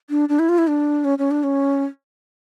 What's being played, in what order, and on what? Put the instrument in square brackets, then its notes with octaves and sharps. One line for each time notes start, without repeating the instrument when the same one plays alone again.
[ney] D4
D4
E4
F4
E4
D4
C#4
C#4
D4
C#4